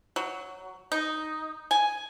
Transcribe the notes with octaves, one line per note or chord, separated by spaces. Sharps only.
F#3
D#4
G#5